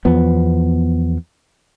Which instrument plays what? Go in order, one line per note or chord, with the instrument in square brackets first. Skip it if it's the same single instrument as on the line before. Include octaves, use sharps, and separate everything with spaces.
[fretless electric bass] E2 F3 B3